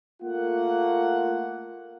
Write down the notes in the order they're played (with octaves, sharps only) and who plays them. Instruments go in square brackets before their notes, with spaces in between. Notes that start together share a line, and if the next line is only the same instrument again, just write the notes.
[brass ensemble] A3 A#3 F4 F#5